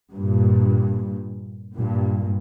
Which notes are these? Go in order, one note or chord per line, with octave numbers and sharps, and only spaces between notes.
G2 A#2
G2 A#2